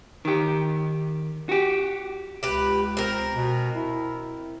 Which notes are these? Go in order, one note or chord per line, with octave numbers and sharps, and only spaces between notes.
D#3 G4
F#4 G4
C#2 G4 B4
C4 A#4
B2
E4